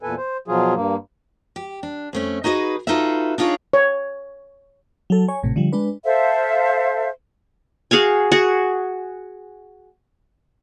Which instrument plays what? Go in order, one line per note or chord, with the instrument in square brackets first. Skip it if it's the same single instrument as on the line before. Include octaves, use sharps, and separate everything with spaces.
[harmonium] E2 A#2 A4 B4 G#5
C5
B2 F3 F#3 F4 G#4
G2 A#3
[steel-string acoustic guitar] G4
D4
F2 A3 C#4
D#4 F#4 G#4 B4 D#5
D#4 F4 F#4 A4 B4 E5
D4 D#4 F4 G#4 C#5
[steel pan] C#5
[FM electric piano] F#3 A4
C#5 G#5
G#1 A2 C3
D3 F3 G3
G#3 D4 B4
[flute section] A4 C5 E5 F5
[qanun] F#4 G#4 F5 G#5
F#4 G#4